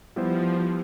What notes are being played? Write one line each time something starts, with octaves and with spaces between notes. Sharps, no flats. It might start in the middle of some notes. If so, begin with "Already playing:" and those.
F3 G3 B3 E4 G4 C5